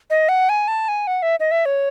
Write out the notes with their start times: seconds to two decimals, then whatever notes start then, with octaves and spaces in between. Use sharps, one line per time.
0.10 D#5
0.29 F#5
0.49 G#5
0.68 A5
0.88 G#5
1.07 F#5
1.22 E5
1.40 D#5
1.51 E5
1.66 C#5